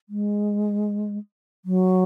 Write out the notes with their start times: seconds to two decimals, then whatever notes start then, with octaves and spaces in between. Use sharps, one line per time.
0.09 G#3
1.65 F#3